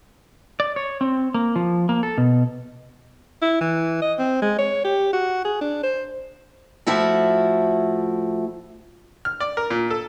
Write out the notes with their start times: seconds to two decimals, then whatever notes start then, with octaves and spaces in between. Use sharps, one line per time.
0.60 D5
0.76 C#5
1.01 C4
1.34 A#3
1.56 F3
1.89 A#3
2.03 A4
2.18 B2
3.42 E4
3.61 E3
4.02 D#5
4.19 C4
4.42 G#3
4.58 C#5
4.85 G4
5.13 F#4
5.45 G#4
5.61 D4
5.83 C5
6.87 A2 F3 A3 E4 F#4
9.25 F6
9.40 D5
9.57 A#4
9.71 A#2
9.90 A4